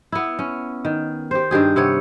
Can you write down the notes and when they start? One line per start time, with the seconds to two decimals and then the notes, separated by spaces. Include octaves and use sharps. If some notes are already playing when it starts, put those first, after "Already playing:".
0.12 B3 E4
0.39 C#4
0.85 D#3
1.31 G4 C5
1.51 G2 D#3 G4 G#4
1.76 C3 B3 C#5